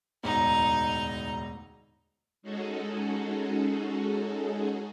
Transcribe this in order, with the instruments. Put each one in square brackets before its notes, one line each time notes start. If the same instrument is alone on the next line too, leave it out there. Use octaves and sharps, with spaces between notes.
[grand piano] E1 A1 D2 [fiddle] D#4 A#5
[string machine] G#3 C#4 D#4 F#4 G#4 A4